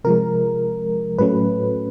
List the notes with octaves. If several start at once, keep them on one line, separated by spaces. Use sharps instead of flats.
C3 F3 G#3 A#4
A2 F#3 A3 C#4 B4